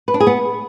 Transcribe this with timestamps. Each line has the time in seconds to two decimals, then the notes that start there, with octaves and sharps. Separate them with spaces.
0.08 B4
0.14 D4
0.20 G#4
0.27 B3